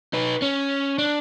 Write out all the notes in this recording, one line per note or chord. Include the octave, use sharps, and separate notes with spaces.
D#4 B4
C#4
D4